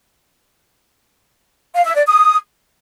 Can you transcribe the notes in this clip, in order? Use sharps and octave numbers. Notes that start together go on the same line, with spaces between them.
F5
E5
D5
D#6